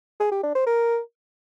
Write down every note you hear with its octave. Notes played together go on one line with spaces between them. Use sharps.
G#4
G4
D4
C5
A#4